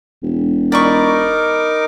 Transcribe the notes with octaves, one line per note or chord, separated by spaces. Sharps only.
E1
D#4 A#4 D5 B5 C#6 D6